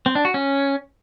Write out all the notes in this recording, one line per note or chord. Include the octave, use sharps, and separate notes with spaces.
C4
D4
F#4
C#4